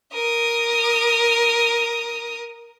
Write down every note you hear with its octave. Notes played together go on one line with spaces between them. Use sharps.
A#4 D#6